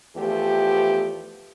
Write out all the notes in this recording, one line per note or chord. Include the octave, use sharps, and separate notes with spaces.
E2 F3 A3 B3 G4